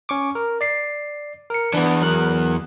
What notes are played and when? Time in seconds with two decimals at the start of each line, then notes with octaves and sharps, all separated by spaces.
0.09 C#4 C#6 D6
0.35 A#4
0.61 D5 C7
1.50 A#4 C#7
1.73 E2 E3 B3 D4
2.02 F#3 A#4 F#6